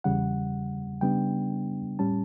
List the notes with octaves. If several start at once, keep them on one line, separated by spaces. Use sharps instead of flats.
E2 C#3 G3 F#5
C#3 G3 B3 D4 G5
A2 G3 C#4 A5